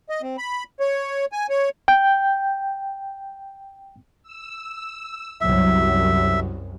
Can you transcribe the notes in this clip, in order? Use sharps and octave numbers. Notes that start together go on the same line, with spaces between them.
D#5
C4
B5
C#5
G#5
C#5
G5 G6
E6
C2 F#2 F#3 E5